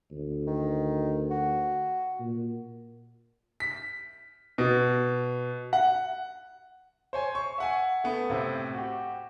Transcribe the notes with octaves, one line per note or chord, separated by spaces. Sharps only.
D2
D#3
F#4
A#2
B6
B2
F#5
C5 C#5 G#5
C#6
E5 F#5 G#5
A3 B3
A2 C3 C4
F#4 G4